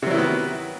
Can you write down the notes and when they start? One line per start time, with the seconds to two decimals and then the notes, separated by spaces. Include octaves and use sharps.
0.02 C3
0.06 F#3
0.10 E4
0.14 D#3
0.18 B3